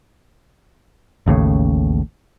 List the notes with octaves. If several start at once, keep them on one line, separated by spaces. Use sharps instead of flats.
A1 D#2 A2 C#3